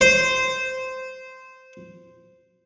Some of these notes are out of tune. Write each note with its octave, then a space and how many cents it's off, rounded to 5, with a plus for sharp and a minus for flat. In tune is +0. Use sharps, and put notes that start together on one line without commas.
C5 -10